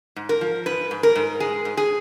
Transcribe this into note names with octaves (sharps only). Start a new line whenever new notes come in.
G#2
A#4
F3
G#2 B4
G#2
A#4
G#2
G#3 G#4
G#2
G#4